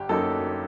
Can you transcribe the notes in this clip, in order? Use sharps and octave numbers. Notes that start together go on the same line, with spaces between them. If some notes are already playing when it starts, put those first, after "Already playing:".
Already playing: G1 G4
F#2 F#3 A#3 D#4 A4